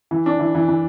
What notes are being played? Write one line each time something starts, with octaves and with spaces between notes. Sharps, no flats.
E3
D4
E3
E3
E3